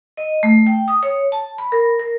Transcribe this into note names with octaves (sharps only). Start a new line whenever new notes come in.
D#5
A3
G5
D#6
C#5
A5
B5
A#4
A#4